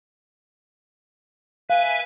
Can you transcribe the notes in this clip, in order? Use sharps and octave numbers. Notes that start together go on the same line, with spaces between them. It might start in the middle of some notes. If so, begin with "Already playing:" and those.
B4 E5 F5 G#5